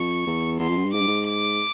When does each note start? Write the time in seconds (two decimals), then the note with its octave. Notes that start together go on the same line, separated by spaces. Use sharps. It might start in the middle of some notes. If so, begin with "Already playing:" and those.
Already playing: F2 C#6
0.27 E2
0.59 E2 C6
0.69 F2
0.77 F#2
0.85 G2
0.94 G#2 D6
1.01 G2
1.08 G#2
1.27 D6